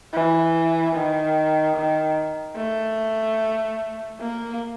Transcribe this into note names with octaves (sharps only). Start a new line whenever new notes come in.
E3
D#3
D#3
A3
A#3